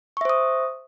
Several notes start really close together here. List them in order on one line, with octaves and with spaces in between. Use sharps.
C#6 E5 C5 D#6